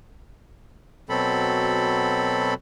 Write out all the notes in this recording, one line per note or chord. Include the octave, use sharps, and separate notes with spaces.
B2 F#3 C4 A4 B5